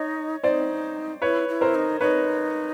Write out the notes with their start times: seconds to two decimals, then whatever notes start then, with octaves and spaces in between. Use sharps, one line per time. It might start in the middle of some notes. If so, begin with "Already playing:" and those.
Already playing: D#4 C#5 D#5
0.43 D#4 E4 C5 D5
1.22 E4 B4 C#5
1.49 E4
1.61 A#4 C5
1.75 D#4
2.01 D#4 B4 C#5